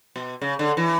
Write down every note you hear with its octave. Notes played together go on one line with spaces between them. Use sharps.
B2
C#3
D3
E3